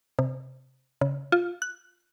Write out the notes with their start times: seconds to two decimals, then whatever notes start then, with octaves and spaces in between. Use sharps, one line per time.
0.19 C3
1.01 C#3
1.32 F4
1.62 F#6